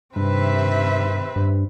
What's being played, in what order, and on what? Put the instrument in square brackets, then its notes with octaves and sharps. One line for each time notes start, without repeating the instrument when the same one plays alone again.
[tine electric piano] G2 [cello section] C3 D#3 E5 [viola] C4 B4
[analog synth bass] G2